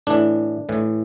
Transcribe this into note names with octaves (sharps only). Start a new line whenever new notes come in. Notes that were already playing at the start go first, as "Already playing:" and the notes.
A2 E3 D4
A2 E3